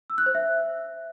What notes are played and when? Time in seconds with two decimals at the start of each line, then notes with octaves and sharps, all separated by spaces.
0.10 E6
0.18 F#6
0.26 C5
0.35 E5